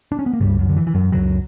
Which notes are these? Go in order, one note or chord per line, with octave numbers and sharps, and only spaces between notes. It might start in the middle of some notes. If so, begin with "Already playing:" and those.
D4
C#4
B3
A#3
C#2 G2 C#3 G3
F#2 F#3
D3
E3
E3
F#2 F#3
C#2 F#2 C#3 F#3